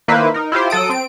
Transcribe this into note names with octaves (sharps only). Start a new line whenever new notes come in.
D#3 A#3 E4 B4 C5
D#4 A#4
E4 F4 G4 C5
F#3 A4 D#6 D7
C4 D7